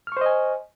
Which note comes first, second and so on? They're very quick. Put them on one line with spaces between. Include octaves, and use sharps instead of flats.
F6 C#6 C5 D#5 G#5